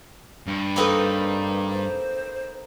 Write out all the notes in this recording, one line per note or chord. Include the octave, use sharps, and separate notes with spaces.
G2
A#3 C4 D#4 A4 B4 B5
C5